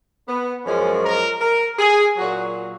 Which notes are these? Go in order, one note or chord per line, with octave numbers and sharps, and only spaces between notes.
B3
F#2 F3 G#3 C#4
A#4
A#4
G#4
A#2 F#3 F#4